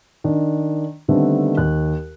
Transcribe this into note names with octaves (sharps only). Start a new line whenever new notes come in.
D#3 D4
D3 D#3 G3 A3 B3 C4
D#2 F#6